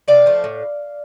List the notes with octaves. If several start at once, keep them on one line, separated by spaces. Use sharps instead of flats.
C3 D5 F5
F3 A3
A2